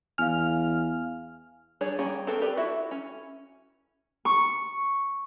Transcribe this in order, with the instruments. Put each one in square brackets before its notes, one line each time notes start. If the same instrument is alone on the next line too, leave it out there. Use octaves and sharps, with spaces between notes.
[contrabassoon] E2 [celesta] F5 G#5 [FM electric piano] F6
[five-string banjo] G3 D4 G#4 C#5 D5
G3 A#3 C#4 G#4 G5
B3 C4 A4 A#4 G5
G4 B4 D5
E4 F#4 A4 E5
C#4
[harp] C#6